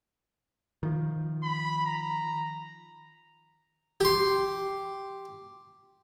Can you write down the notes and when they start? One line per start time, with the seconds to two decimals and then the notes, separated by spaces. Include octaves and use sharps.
0.83 D#3 F3
1.43 B5
1.85 A#5
4.01 G4 C6